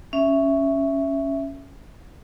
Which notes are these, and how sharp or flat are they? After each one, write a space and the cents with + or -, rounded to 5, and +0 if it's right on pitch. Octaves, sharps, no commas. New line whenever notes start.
C#4 +0 E5 +5